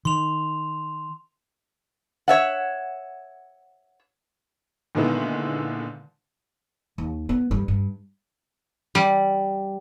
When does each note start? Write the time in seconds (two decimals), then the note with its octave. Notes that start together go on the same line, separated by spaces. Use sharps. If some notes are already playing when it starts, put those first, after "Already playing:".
0.05 D#3 C6 F7
2.28 C#5 E5 F#5
4.95 A#2 D3 D#3 G#3 B3 E4
6.98 D#2
7.29 B3
7.51 G2
7.68 G2
8.95 G3